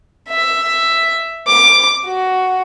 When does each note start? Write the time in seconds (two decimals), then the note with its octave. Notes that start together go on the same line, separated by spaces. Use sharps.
0.29 E5
1.47 D6
2.05 F#4